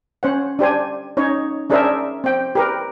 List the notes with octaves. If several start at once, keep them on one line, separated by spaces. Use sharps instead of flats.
C#4 C5 F#5
D4 G4 C5 G#5
C#4 D#4 C#5
C#4 D4 G#4 A#4 C5 E5
C4 G5
G4 A#4 B4